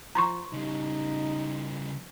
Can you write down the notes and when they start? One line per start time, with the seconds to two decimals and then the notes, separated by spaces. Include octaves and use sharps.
0.15 F3 A#5 C6 C#6
0.53 C#3 G3 D#4